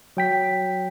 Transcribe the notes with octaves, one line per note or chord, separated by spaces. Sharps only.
F#3 G5 B6